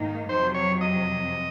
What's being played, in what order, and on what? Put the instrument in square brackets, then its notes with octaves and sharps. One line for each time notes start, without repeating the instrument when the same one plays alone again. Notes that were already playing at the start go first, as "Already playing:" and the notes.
Already playing: [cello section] G#2 D#3 A#3 D#4
[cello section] F2 C3 F#3 [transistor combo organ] C5
[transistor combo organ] C#5
D#5